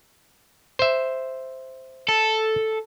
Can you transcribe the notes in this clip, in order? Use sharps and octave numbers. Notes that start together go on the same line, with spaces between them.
C5 E5
A4